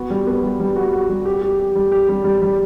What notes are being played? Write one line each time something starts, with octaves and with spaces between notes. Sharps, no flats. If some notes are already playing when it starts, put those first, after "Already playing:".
Already playing: B3 F#4
G3
B3
G3
G3
F#4
F#4
G3
G4
G4
G4
G3
G4
G3
G3
G3